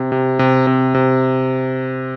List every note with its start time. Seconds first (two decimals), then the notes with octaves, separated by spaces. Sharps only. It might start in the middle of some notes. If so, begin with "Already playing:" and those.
Already playing: C3
0.12 C3
0.39 C3
0.67 C3
0.95 C3